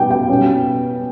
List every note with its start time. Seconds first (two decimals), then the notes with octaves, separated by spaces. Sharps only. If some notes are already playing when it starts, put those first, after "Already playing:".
Already playing: B2 G3 B3 D#4 G5
0.11 G5
0.29 B2 G3 C#4